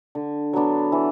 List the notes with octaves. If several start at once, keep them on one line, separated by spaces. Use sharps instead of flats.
D3
F#3 B3 D4
E3